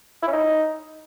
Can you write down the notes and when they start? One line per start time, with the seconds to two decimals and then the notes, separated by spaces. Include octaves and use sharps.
0.22 E4
0.27 C#4
0.32 D#4